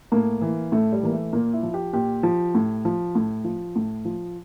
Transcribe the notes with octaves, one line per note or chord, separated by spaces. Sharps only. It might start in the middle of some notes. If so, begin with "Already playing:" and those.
A2 A#3
E3
A2 A3
G3
E3 A#3
A3
A#2 A#3
E4
F3
G4
A#2 G4
F3
A2
F3
A2
F3
A2
F3